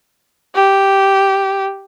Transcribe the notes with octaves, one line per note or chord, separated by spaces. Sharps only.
G4